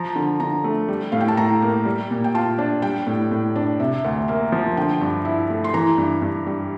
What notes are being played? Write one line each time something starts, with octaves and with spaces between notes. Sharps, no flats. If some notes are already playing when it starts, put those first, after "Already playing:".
Already playing: F3 A#5
D3
D3 A#5
A3
G3
A2 F5
G5
A5
A2 A#5
A#3
G3
A#2
G5
F4 A5
D4
G3 G5
A2
A2
D4
C3 E5
D2
A#3 E5
F3
D3 G5
G2
E4
A3
C6
E3 A#5
G2
G2
G3